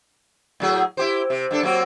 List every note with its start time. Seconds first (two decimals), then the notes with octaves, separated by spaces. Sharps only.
0.60 A2 F#3 G#4
0.97 E4 G4 C5
1.30 C3
1.51 G2 D4 A4
1.63 F#3 A#3 C4